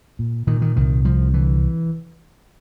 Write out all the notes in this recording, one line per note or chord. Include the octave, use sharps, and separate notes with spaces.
A#2
A#2 D#3
D#3
C2 D#3
C2 F3
D3 E3